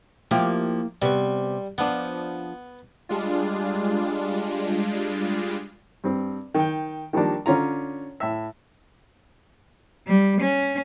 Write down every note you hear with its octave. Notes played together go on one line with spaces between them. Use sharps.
F3 A#3 E4 G4
C3 G3 B3 C#6
F3 B3 D4
G3 G#3 D4 F4
G2 C4
D#3 G5
D#3 F3 G3 A#3 D4
D3 C#4 F4 A#5
A2 E5
G3
C#4